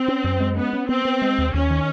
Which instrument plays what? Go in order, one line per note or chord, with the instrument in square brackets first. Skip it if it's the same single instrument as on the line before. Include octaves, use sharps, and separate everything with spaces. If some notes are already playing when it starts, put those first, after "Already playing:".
Already playing: [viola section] C4
[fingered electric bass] C#4
F#2
G#3
[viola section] B3 [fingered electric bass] C#4
[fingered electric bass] C#4
[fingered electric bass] B3 [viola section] C4
[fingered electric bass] B3
G#3
D#2
[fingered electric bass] D#2 [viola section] C#4
[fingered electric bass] D#3